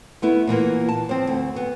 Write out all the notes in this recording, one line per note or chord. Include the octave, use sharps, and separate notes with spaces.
A3 B3 E4
A#2 E3 A#3 B3
A5
F3 C4
D2
B3